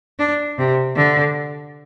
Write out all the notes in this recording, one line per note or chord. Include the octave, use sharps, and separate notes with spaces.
D4
C3
D3